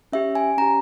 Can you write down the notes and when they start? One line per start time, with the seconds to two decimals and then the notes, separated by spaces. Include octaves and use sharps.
0.12 C#4 G4 E5
0.35 G#5
0.57 C#4 G4 A#5